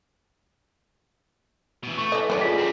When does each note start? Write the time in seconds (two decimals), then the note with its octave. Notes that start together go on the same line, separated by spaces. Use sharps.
1.83 B2 E3
1.98 A3 C#6
2.12 E3 A4 D#5
2.30 F#2 G4 C5 D5
2.41 F4 G#4 B6
2.58 C4 D4